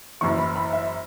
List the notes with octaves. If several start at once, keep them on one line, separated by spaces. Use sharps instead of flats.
F#1 F#2 E3 C#6
B5
B5
E5